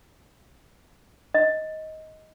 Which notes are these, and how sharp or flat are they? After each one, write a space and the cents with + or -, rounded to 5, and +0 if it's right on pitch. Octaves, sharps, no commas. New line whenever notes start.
D#5 +15